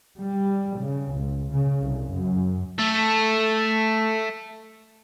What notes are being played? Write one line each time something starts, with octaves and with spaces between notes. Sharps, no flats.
G3
C#3
C#2
C#3
C2
F#2
A3 A4